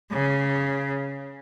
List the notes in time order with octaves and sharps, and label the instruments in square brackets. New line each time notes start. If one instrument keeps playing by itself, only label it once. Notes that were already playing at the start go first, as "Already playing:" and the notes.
[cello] C#3